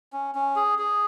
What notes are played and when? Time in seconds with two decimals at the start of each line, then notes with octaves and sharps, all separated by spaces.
0.13 C#4
0.35 C#4
0.56 G#4
0.79 G#4